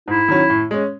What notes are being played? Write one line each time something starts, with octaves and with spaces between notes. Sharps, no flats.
G#2 E4
D#3 F#3 C#4
A2
G#3 C#4